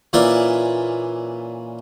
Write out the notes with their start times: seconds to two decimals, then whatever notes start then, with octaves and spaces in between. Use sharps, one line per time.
0.13 A#2 E3 C#4 A#4 D5